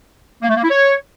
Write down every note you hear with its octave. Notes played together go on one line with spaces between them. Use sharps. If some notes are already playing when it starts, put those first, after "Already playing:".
A#3
A3
A#3
E4
C#5